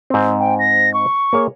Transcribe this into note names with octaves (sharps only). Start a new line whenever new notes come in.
G#2 C4
G5
A#6
C#6
A#3 G#4 C#5